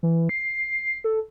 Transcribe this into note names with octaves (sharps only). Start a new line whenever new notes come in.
E3
C7
A4